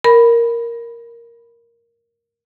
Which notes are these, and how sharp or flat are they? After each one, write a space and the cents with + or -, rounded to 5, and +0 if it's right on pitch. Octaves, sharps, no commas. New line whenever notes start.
A#4 +0 B5 +0